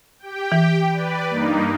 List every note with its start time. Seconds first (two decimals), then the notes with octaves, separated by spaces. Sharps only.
0.19 G4 G5
0.52 E3
0.89 B4 D5
1.30 G2 A#3 D#4